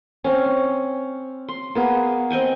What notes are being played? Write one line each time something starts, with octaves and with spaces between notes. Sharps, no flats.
C4 C#4
C6
A#3 B3 G#4
C4 D#5 G5 G#5